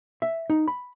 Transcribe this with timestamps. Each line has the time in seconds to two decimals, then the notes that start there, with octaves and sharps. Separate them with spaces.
0.22 E5
0.50 D#4
0.68 B5